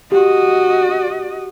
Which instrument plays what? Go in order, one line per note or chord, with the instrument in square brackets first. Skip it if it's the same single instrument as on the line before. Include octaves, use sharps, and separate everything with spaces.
[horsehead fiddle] F#4 D#5 [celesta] G4